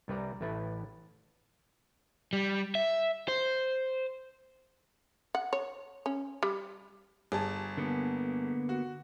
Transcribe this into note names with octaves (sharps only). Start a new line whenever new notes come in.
C2 G3 B4 D5 A#5
A1 A3 E4 B4
G3
E5
C5
F#5
C#5
C#4
G3
G1 G#4 A5
D3 A#3 B3
F#4